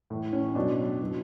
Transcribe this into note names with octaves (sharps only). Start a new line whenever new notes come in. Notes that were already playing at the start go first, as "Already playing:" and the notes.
A2 E3
C#4
B2 F#3 D4
B2 F#3